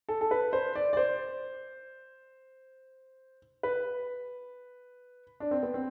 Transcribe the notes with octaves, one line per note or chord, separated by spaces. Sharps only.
A4
A4
B4
C5
D5
D5
C5
B4
D4
C4
B3
C4